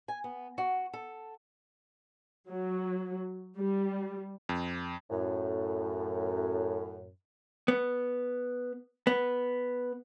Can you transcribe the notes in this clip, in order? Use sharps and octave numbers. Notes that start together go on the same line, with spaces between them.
G#5
B3
F#4
A4
F#3
G3
F2
F#2 A2
B3
B3